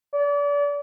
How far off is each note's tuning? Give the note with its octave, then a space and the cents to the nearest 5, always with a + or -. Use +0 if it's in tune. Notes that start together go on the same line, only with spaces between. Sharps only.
D5 -35